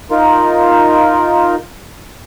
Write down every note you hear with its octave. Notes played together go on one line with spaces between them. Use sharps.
D#4 F4 A#4